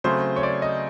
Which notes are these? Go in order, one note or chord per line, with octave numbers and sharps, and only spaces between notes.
C#3 F#3 A3 C4 C5
C#5
D5
D#5